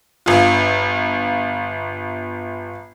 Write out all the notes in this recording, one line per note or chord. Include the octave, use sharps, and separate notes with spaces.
G1 F4